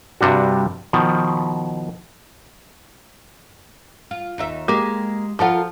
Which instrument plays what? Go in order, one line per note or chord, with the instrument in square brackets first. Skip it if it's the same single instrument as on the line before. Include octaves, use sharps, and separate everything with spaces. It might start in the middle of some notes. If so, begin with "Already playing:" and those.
[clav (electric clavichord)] G2 C3 G3 D4 F#4
B2 D#3 F3
[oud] F4
D#2 D#4 E5
[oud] G#3 G4 [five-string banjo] A#3
[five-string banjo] F3 F#5 [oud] F4 A4 A#4